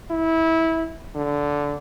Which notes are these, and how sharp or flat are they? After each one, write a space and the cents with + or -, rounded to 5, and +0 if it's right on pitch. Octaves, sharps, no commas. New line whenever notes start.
E4 -20
D3 -15